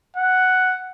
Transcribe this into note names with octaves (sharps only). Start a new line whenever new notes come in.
F#5